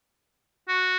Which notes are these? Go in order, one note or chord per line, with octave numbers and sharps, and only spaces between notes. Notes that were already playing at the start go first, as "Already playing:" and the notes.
F#4